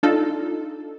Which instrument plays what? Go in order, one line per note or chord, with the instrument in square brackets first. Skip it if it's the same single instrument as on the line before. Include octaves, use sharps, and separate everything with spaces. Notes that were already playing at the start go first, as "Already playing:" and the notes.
[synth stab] D4 D#4 F4 A4